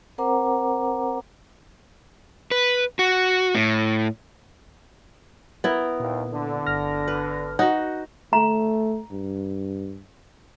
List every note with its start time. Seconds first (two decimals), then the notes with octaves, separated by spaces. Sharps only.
0.18 C4 A#4 C5 F#5 A#5 D6
2.51 B4
2.99 F#4
3.55 A2
5.64 B3 E4 A#4
6.00 D#2 A#2
6.32 D3
6.66 G1 F6 A#6
7.08 B4
7.59 D#4 F#4 F#5
8.33 A3 A#5
9.11 G2